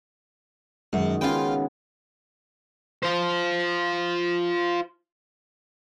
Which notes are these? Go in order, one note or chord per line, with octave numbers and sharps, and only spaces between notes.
F#2 D#3 G#3 F#4
C#3 B3 F4 G5
F4 C5